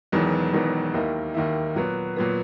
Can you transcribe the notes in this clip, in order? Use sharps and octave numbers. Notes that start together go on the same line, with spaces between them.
E1 E2 D#3 F#3 B3
E1 E2 D#3 F#3 B3
D#2 D#3 A#3 E4
D#2 D#3 A#3 E4
A#2 F#3 B3
A#2 F#3 B3